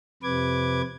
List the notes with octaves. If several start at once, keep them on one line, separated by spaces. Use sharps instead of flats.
F2 C3 B4 D6 G#6